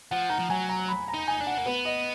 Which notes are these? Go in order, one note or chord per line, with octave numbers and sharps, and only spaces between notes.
F3 F#5
D#3 A#5
F3
F#3 G#5
A#5
B5
A#5
D#4
G#5
D4
F#5
A#3
B3 B4
D#5